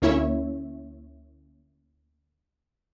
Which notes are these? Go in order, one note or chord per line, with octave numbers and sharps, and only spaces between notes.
D2 A#3 C#4 E4 C#5 E5